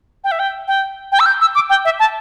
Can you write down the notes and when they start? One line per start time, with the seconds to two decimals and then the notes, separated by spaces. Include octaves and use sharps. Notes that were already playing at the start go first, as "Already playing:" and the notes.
0.24 G5
0.32 E5
0.39 G5
0.68 G5
1.12 G5
1.20 E6
1.26 G6
1.41 E6
1.55 D6
1.70 G5
1.85 E5
1.99 A5